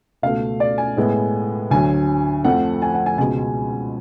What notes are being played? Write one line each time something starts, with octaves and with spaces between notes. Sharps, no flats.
C#2 B2 A3 F5
D5
G#5
A2 G#3 B3
D2 D3 F#3 G#5
F2 F3 A3 F#5
G#5
F#5
G#5
C#2 B2 G#3 G#5